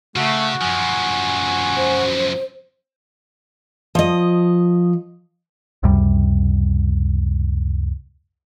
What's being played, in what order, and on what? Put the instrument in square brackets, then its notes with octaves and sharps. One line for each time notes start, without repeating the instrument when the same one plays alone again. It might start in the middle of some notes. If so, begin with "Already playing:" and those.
[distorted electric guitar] C#3 [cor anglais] A3 [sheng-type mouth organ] F#4
[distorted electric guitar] F#2 F3 [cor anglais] G#5
[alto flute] C5
[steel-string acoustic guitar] F3 D#5
[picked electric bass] C#2 F#2 C3 G3